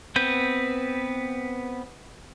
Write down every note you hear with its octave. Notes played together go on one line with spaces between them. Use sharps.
B3 C4 B4 G6